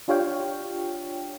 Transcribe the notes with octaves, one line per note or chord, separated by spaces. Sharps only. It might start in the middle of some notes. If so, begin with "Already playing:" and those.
D4 F4 G4 C#5 F5 G5